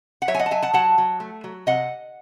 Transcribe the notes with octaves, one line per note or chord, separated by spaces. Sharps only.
F#5
F#3 C#5 E5
G#5
D#5 F#5
A5
F#3 E5 G#5
F#5 A5
F#3 F#5 A5
F#3
A3
F#3
C3 D#5 F#5